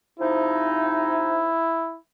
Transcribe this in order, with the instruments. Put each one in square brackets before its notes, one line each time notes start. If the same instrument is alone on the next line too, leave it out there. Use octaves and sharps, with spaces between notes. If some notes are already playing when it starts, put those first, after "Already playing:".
[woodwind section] C3 F3 D#4 [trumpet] E4